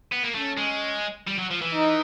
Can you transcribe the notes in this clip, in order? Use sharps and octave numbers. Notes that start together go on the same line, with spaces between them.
B3
A#3
A3 C#4
G#3
G3
F#3
F3
E3
D#4